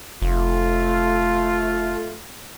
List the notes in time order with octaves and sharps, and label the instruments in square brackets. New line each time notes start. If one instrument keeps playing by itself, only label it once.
[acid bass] F1 [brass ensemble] A3 F4